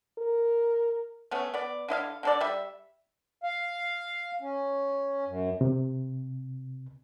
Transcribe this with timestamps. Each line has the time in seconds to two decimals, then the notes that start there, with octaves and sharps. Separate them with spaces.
0.18 A#4
1.31 A3 B3 C#4 C#5
1.54 B3 D5
1.88 D3 E4 D#5 F5
2.23 D3 A4 D5
2.41 G3 E5
3.43 F5
4.41 C#4
5.28 F#2
5.61 C3